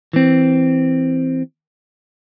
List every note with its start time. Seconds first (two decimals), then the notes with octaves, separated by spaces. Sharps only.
0.13 E3 C4